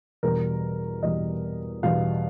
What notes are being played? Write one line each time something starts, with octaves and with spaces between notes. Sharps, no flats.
E2 B2 G3 A#4
E2 B2 G3 D#5
E2 B2 G3 F5